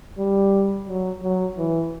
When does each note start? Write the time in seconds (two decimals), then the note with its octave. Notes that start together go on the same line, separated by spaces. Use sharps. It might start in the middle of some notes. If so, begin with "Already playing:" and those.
0.18 G3
0.88 F#3
1.23 F#3
1.57 E3